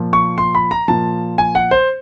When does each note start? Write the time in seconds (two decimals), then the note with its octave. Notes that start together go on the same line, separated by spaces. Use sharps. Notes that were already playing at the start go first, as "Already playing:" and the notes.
Already playing: A#2 F3
0.13 C#6
0.38 C6
0.55 B5
0.71 A#5
0.88 A#2 F3 A5
1.38 G#5
1.55 F#5
1.71 C5